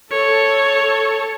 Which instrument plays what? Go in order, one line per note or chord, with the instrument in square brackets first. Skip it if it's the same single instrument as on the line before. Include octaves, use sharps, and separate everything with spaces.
[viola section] A4 [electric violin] C#5